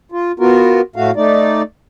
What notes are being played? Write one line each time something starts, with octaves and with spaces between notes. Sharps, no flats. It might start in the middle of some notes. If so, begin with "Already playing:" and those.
F4
B3 F4 F#4 A#4
A2 A3 F#4 F5
A3 D#4 D5